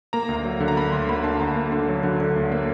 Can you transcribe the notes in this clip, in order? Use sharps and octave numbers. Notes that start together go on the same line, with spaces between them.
A#3 A#5
D2
F#3
D3
A#5
A#3 B5
D2 C6
A#3 B5
D3 A5
D2 A#5
A#3
D3
F#3
D3
D3
D2
A#3